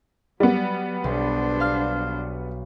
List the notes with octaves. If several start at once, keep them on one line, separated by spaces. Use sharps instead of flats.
F#3 G3 B3
B1 D4 C5
F5 F6